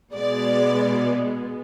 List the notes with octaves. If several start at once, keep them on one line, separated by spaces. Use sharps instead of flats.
B2 G#3 B3 D5